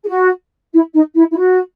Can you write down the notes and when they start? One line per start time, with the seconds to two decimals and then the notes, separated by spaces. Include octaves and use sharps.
0.04 G#4
0.08 F#4
0.73 E4
0.94 D#4
1.16 E4
1.31 E4
1.37 F#4